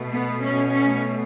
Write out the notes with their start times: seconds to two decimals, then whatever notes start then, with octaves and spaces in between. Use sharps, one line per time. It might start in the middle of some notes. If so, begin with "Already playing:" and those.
Already playing: B2 A3
0.13 B3
0.42 C#4
0.71 C#4